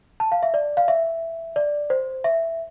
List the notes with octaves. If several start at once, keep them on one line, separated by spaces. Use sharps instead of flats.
A5
F5
E5
D5
F5
E5
D5
C5
E5